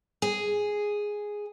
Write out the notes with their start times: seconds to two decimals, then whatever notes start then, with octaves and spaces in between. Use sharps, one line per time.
0.22 G#4